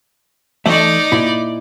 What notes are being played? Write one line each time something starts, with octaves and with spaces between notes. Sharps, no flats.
E3 A3 D#4 D5 E5
A#2 E4